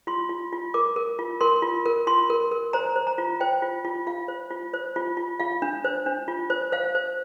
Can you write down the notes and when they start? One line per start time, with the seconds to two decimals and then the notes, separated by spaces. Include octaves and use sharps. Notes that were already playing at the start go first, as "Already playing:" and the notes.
0.07 F4 C6
0.29 F4
0.53 F4
0.74 A#4 D6
0.96 A#4
1.19 F4
1.41 A#4 C6
1.62 F4
1.85 A#4
2.07 F4 C6
2.30 A#4
2.51 A#4
2.73 C5 A#5
2.96 C5
3.07 A#5
3.18 F4
3.40 C5 G5
3.62 F4
3.85 F4
4.07 F4 F5
4.28 C5
4.51 F4
4.74 C5
4.96 F4
5.17 F4
5.40 F4 F5
5.62 D4
5.84 C5
6.06 D4
6.28 F4
6.50 C5
6.72 C5 F5
6.95 C5